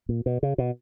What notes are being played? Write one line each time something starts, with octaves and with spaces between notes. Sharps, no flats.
A#2
B2
C#3
B2